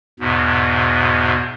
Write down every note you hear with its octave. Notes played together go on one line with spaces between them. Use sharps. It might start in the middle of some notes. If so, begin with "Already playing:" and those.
E2 G#2 B2